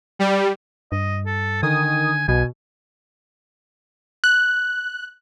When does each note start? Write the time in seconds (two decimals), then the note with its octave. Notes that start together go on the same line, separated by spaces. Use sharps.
0.19 G3
0.92 G2 D#5
1.26 A4
1.63 D3 D#3 G#5 D#6
2.28 B1 B2 G#5
4.24 F#6